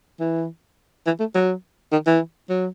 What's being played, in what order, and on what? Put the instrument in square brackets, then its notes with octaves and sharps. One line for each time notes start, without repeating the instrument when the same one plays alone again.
[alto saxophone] E3
E3
A3
F#3
D#3
E3
F#3